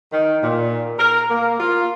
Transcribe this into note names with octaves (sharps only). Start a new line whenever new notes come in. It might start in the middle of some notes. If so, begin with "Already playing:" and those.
D#3
A#2
A#4
A#3
F4